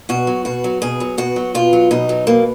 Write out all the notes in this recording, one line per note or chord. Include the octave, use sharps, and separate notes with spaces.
B2 F#4
F#3
B2 F#4
F#3
B2 G#4
F#3
B2 F#4
F#3
B2 F4
F#3
B2 D#4
F#3
B2 A#3